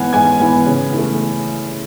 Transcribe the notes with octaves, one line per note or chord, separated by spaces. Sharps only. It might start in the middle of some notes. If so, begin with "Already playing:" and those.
Already playing: G#2 E3 B3 F#5 G#5 F#6 G#6
G#2 G#5 G#6
E3 B3
C#3
E3 A3